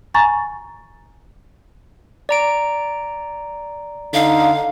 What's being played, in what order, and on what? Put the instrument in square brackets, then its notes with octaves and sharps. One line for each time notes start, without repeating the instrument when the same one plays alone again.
[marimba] G#5 A#5 C#6 A6
[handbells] D5 A#5 D7
[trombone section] D3 D#4 [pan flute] F5